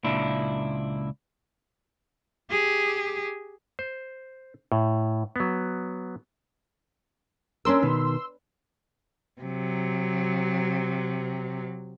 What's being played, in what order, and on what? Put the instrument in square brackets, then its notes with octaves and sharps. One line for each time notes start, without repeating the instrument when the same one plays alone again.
[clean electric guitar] C#2 A#2 D4 E4
[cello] G4 G#4
[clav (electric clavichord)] C5
A2
F#3 B3
[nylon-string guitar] C#4 D4 A#4 [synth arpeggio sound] C6 E6
[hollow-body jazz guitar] B2 D#3 [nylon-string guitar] B4
[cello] C3 F#3